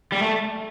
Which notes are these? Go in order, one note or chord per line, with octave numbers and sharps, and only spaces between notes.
G3
A3